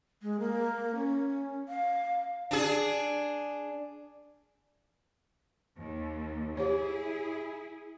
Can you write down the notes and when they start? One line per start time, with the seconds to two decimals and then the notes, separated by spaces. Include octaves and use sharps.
0.22 G#3
0.40 A#3
0.95 C#4
1.69 F5
2.51 D4 G#4
5.77 D#2
6.57 E4 G4 G#4 C#5